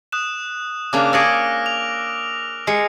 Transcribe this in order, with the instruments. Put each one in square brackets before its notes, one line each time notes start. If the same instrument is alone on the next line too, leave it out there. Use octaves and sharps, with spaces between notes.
[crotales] D#6 F#6 E7
[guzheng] C#3 A#3 D4 [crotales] D6 F6
[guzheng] G#4 C#5 D5 [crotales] E6 A#6 D7
[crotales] F7
[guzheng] G#3 [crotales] C7 C#7